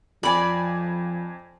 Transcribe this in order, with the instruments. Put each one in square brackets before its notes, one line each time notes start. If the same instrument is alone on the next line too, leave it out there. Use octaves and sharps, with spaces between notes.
[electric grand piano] F2 G#5 [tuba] F3 [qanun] D5 B5